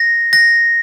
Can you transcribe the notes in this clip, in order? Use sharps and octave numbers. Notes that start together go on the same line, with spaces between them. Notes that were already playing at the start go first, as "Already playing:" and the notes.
Already playing: A#6
A#6